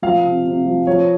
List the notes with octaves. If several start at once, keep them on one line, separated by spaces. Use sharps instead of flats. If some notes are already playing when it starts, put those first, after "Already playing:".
F3 F5
C3
C3
F3
F3 C#5